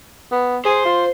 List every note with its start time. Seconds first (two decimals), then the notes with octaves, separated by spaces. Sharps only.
0.32 B3
0.65 G#4 C5
0.85 F4